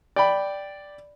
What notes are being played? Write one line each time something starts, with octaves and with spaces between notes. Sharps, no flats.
D5 G5 B5